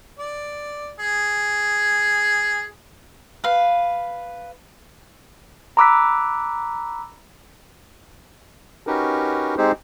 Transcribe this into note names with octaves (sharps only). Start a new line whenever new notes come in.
D5
G#4
B4 F5
A#5 B5 D6 E6 F#6 B6
C#4 D#4 F#4 G4 A#4 B4
G#3 C4 D#4 G4 G#4 C5